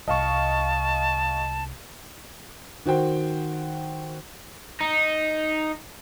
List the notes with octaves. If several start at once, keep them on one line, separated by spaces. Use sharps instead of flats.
C2 D#5 F5 A5 C#6
D#3 F#4 C5 G5
D#4